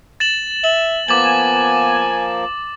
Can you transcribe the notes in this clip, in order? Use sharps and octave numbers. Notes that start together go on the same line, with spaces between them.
A6 E7 F#7
E5 F#7
F3 A#3 B3 G#5 D6 A6 F#7